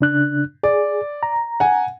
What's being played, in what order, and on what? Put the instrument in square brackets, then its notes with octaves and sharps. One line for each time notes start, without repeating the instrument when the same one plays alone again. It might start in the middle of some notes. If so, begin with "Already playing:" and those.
[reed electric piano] C#3 D4 F#6
[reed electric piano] G#4 [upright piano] D5
[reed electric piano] A#5
[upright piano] F#5 G#5